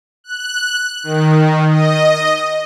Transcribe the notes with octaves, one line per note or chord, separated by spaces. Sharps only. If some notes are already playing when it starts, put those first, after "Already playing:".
F#6
D#3
D#5